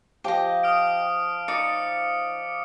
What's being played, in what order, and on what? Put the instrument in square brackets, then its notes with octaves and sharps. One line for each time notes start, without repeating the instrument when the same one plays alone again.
[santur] F3 [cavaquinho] G4 D#5
[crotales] D#6 F6 D7
[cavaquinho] D#4 [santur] D5 [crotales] C#7